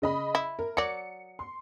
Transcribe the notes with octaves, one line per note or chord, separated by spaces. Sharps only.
C#3 D#5 B5
E4
A#4
F#3 D5 C#7
C6